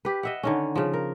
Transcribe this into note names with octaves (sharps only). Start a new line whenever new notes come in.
G4 B4
D#5 E5 F#5
D3 D#3 C#4
C#3 F3
A#4